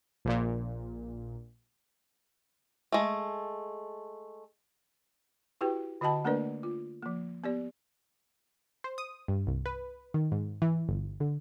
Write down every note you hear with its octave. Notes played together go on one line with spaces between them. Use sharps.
A#1 A#2
G#3 A3
E4 F#4 G4 B4 G5
D3 F#4 D#5 G5 A5 B5
A3 A#3 D4 A#4 B4 D5
F4
F3 A#3
B3 G4 D5
C5
D#6
G2
C2
B4
D#3
G#2
E3
G1
D3